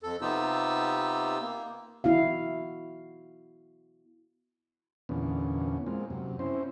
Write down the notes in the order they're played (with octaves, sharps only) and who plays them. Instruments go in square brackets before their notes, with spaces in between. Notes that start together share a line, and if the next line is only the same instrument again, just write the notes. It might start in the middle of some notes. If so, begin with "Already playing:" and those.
[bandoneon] F2 A4
C3 B3 D#4 F4 G4 E6
A#3
[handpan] B3 E4 F#4 F5
[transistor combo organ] E2 A#2 D3 B3 C#4
G#3 A#3 C4 F4
F#2 C3
C4 C#4 E4 C5